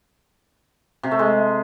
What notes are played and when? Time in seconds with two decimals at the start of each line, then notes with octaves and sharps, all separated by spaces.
1.03 C3
1.11 A3
1.19 G#3